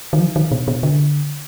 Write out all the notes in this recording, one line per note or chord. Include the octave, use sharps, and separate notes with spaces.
D#3
F3
D#3
B2
B2
D3